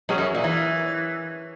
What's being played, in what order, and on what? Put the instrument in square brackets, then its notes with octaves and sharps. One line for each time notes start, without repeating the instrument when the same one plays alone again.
[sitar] B2 [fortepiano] F#3 C#4 G#4
[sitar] F#2
A#2
E3